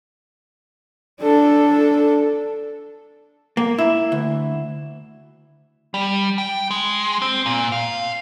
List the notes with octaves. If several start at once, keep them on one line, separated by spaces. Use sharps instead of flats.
D4 A4
A#3
E4
D2
G3
G5
G#3
C4
A#2
F5